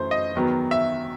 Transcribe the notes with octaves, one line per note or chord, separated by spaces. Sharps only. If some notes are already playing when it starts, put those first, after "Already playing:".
Already playing: F#2 E3 A3 C5
D#5
E2 D#3 F#3 B3
E5